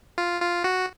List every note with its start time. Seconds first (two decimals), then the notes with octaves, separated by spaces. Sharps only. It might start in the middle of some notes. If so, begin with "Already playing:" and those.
0.18 F4
0.42 F4
0.64 F#4